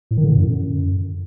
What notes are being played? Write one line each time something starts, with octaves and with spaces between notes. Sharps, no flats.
A2
D#3
D3
A2
F#2